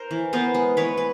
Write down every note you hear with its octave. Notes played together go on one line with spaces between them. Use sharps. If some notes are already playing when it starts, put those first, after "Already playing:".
Already playing: A#4 C5
E3
B3 A#4 C5
G#3
E3 B4 C#5
B4